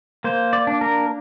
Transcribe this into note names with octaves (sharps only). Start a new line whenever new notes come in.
A#3 C5
D5
D4
A#4